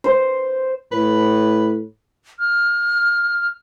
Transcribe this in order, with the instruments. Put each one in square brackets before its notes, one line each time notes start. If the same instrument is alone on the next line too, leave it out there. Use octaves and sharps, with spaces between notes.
[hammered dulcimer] C5
[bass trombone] A2 [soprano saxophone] B4
[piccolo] F6